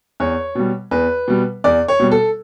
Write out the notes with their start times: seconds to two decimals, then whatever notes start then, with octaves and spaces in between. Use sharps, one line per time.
0.20 E2 C#5
0.55 B2 G3
0.91 E2 B4
1.28 B2 G3
1.64 E2 D5
1.88 C#5
2.00 B2 G3
2.12 A4